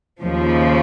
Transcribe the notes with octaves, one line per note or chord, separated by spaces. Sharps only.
D#2 C#3 F3